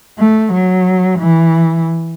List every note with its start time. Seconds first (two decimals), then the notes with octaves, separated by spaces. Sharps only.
0.19 A3
0.53 F#3
1.20 E3